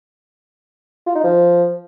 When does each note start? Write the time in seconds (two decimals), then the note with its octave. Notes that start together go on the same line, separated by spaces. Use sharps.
1.06 F4
1.15 D#4
1.24 F3